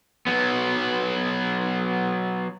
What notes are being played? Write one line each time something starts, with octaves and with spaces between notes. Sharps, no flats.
F#3 B3